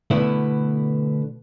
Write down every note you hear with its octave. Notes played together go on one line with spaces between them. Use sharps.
B2 D3 A3 B3 E4